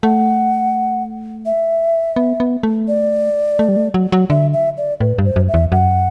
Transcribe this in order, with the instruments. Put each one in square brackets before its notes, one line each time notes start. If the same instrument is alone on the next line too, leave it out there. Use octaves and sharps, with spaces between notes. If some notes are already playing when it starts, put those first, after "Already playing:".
[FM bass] A3 [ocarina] F#5
[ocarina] E5
[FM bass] B3
B3
A3
[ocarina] D5
[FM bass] A3
G3
A3
F#3
F#3
[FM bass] D3 [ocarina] E5
[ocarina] E5
D5
[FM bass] A2 [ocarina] B4
[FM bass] G2
[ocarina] C5
[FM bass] F#2
[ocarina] E5
[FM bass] E2
[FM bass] F#2 [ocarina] F#5